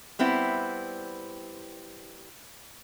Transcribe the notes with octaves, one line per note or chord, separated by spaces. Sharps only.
G3 B3 C4 E4